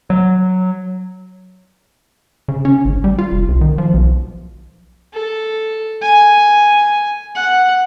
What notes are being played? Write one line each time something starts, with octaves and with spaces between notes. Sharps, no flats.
F#3
C#3
C#4
G#1
G3
F4
F1
C2
D#3
F3
B1
A4
G#5
F#5